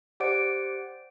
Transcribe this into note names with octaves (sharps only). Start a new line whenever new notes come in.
G4 C5 D5 F#5 D6 D7